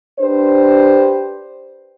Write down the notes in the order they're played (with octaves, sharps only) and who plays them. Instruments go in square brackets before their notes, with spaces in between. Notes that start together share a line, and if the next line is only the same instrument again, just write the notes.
[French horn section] D4 G4 B4 C5